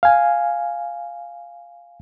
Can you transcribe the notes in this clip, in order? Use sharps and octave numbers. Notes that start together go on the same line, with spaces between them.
F5 G#5